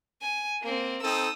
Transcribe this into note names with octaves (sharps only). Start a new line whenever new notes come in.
G#5
A#3 C4
C4 D#4 A4 D#6 E6